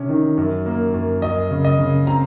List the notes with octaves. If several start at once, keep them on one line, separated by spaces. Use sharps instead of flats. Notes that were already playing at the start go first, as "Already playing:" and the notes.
Already playing: C3 C#4
D#3
F#2
A#3
F#2
F#2 D#5
C#3
D#5
C#3
C4 A#5